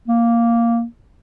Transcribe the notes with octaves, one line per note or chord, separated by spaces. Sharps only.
A#3